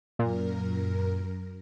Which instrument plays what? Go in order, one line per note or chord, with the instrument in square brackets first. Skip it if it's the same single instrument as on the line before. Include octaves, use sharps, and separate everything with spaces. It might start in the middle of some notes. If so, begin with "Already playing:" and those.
[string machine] F#2 A#4 [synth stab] A#2